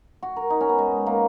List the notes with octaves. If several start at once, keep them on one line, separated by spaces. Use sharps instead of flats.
F#4
A#4
D#4
C#4
B3
G#3
A#3